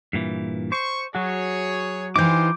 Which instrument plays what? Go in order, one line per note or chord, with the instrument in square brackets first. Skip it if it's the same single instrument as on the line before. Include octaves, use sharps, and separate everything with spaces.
[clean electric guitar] G2 A#2 E3
[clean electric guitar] C5 [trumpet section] C#6
[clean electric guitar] F#3 F#4 [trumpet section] G#4 C#5
[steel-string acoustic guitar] E3 D#4 [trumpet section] F4 G4 C5 [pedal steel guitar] D6 G6